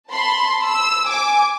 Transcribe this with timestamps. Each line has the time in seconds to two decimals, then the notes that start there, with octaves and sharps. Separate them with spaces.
0.11 A5 B5 C6
0.66 E6
1.08 G#5 D6